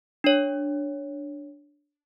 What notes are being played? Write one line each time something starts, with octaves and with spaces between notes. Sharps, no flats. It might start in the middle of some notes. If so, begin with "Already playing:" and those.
D4 C#5